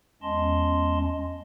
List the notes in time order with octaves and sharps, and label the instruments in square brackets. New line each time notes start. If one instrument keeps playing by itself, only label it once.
[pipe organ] E2 G#3 C#4 D#5 A5 C6